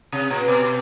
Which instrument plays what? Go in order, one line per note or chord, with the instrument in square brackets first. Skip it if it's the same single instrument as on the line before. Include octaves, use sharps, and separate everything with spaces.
[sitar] C3
A#2
B2